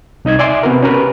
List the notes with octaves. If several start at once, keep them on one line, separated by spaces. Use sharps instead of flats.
C2 D#4 D#5 G#6
D5 E5 G#5 C6 D6
C3 B3 F#4 A#4
C#4 G4 A#4 B4